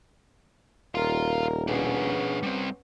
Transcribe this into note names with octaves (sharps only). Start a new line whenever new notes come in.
D#1 A#4 F5 C6
B3 C#4 D4 G#4
G3 C4